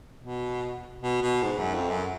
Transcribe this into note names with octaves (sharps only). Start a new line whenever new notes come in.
B2
B2
B2
G#2
F#2
F2
F#2